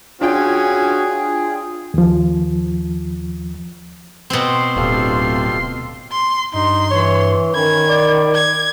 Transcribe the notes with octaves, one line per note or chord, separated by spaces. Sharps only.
C#4 D4 F4 F#4 G#4 G5
D#2 F3
B2 C4 C6
D1 F4 G4 A4
C6
G2 D#4 C6
E3 C#5
D#3 C#4 B5 G#6
D5
G#6